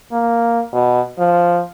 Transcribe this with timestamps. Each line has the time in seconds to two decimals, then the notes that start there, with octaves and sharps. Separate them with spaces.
0.12 A#3
0.73 B2
1.19 F3